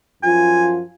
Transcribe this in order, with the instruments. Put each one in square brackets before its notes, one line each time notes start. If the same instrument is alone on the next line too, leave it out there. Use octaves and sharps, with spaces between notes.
[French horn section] F#2 F3 F4 [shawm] G#5